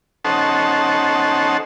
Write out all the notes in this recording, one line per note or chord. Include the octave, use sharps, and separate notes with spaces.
C#4 D#4 A4 C5 F#5 A5